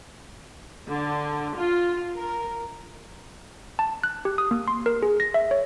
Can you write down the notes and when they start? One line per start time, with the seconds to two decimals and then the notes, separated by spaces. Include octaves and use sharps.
0.88 D3
1.58 F4
2.16 A#4
3.79 A5
4.04 F#6
4.25 G4
4.38 D#6
4.51 A#3
4.68 C6
4.86 A#4
5.03 G#4
5.20 A#6
5.34 E5
5.51 C#5